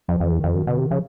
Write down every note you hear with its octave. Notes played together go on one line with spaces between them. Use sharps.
F2 F3
F2
E3
E2
F2 D#3
F#2 D#3
B2 D3
C3 D#3
C#3 F3